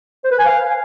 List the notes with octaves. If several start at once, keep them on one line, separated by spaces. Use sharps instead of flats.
C5
B4
G#5
F5